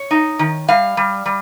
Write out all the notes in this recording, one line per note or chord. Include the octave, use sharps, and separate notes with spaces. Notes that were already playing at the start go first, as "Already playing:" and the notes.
Already playing: C#5
D#4
D#3
G3 F5
G3
G3